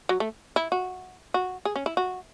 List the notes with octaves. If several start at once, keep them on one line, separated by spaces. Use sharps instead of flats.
F#3
A3
E4
F#4
F#4
G#4
C#4
E4
F#4